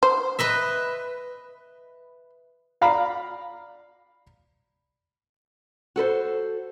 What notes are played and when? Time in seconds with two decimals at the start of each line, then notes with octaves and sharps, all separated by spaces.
0.03 C5
0.39 B4 D#5 E5
2.81 D5 F5 A#5 B5
5.96 F#4 A4 B4 C5